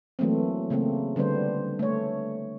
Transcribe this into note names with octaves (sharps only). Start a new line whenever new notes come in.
E3 F#3 A3 A#3 C4
C#3 A3 A#3 C4
D3 G3 B3 D4 C5
A3 C#5